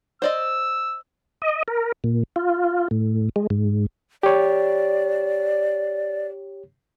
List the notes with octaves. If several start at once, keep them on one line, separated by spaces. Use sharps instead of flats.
C5 D5 D#5 E6
D#5
A#4
A#2
F4
A2
G#3
G#2
G4 C#5 D5